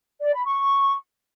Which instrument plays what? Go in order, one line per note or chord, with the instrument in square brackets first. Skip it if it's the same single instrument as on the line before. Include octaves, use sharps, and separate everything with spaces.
[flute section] D5
B5
C#6